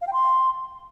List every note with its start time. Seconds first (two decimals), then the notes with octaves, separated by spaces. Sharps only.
0.01 F5
0.07 G5
0.13 C6